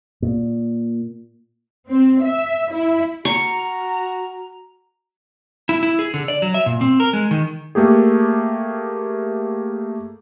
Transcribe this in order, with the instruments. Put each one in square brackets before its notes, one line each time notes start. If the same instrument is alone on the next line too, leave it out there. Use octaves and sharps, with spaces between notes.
[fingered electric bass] A#2
[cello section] C4
E5
E4
[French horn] F#4 [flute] A#5 [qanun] C#6
[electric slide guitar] E4
E4
G#4
D3
D5
F#3
E5
A#2
C4
A#4
G#3
D#3
[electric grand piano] A3 A#3 G4 G#4